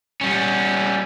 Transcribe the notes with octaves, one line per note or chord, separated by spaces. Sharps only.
G3 C#4